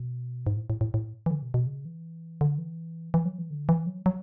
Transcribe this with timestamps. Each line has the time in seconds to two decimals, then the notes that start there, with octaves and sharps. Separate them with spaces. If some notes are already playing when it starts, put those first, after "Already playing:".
Already playing: B2
0.47 G#2
0.57 A2
0.70 A2
0.81 A2
0.94 A2
1.26 E3
1.31 D3
1.42 B2
1.54 B2
1.66 C#3
1.85 E3
2.41 D3
2.58 E3
3.14 E3
3.25 F#3
3.39 E3
3.50 D3
3.69 E3
3.86 F#3
4.06 F#3